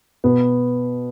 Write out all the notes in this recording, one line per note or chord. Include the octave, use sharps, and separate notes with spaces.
B2 B3